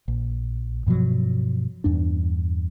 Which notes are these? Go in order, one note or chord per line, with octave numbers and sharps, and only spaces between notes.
A#1
G2 B2 F3 F#3
E2 G2 D4